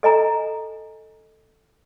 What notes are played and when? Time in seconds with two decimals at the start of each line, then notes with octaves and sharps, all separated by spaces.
0.03 A4 D#5 G#5 A#5